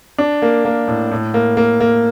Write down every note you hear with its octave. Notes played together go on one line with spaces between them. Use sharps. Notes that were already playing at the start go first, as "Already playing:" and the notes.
D4
A#3
A#3
A2
A2
A#3
A#3
A#3